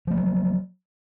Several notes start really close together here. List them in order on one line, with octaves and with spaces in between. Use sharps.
F3 A3 A#3 F#3